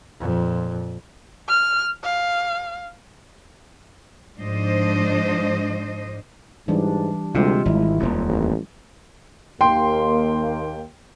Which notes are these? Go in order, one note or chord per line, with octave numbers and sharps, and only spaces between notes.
F2 A#2
F6
F5
G#2 F3 D4 C5 D#5
G#2 E3 G3 D4
D2 C3 G3 G#3 F4
G#1 E4
D#1 F2
A1
D#2 A#3 G5 C6